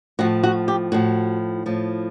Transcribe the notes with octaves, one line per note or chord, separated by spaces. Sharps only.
A2 F3 F#4
F#4
G4
A2 F3 F#4
A2 F3